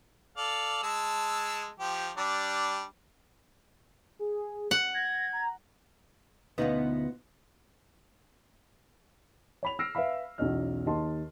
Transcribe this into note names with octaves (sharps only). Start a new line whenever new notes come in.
A4 D5 F5
G#3 A5 E6
F3 G4
G3 D4
G#4
F#5
G#6 A#6
A#5
D2 B2 B3 C#4 D#4 F4
C#5 B5 F7
E6 F6 A#6 C7 D7
B4 E5 F5 B5
B1 E2 C#4 D#5 F6
D#2 G4 D#5 A5 C6